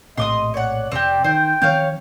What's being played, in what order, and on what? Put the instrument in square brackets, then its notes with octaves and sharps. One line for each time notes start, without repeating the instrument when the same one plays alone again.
[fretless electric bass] A#1 A2 C3 [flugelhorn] D#5 [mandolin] C6 D6 D#6
[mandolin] C#5 F#5 [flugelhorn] D5
[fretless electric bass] F2 C3 [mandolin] C4 G4
[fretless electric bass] D#3 [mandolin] C5 [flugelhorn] G5
[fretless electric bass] D#3 F3 C4 [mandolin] C#5 F5 G6